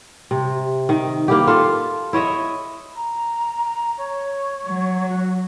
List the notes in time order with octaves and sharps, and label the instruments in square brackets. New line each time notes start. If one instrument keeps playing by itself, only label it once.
[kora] C3
D#3
A#3 E4 G4
F4 A4
E4 C#5 D#5 E5
[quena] A#5
C#5
[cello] F#3
[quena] F#4